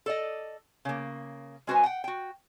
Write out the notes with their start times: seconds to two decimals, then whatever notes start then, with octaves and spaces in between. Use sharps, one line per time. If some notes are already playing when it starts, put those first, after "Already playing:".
0.06 A4 D5 D#5
0.85 C#3 A#3
1.67 G#3 C#4 F#4 B4 C5 G#5
1.84 F#5 G5
2.04 F#4 G5